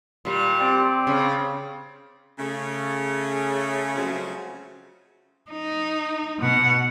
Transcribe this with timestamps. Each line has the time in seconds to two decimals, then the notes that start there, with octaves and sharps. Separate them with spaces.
0.25 A#2 G3
0.60 C4 D5
1.07 C#3
2.39 C#3 A3
3.96 C#3 F3 F#3 G#3 A3 C4
5.51 D#4
6.39 B2 F#5